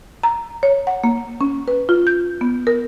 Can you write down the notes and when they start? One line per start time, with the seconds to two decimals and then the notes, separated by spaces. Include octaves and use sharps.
0.23 A#5
0.63 C#5
0.87 F#5
1.04 A#3
1.41 C#4
1.68 B4
1.89 F4
2.07 G6
2.41 B3
2.67 A#4